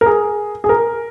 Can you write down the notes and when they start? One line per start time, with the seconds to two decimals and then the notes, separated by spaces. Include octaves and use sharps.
0.01 A#4
0.06 G#4
0.64 G#4
0.69 A#4